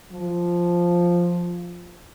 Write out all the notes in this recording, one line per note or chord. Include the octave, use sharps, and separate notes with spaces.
F3